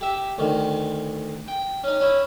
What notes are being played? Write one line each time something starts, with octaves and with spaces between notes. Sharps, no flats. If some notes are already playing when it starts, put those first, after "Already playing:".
G4 E5
D2 D#3
G5
C#4 D#4
C#4 E4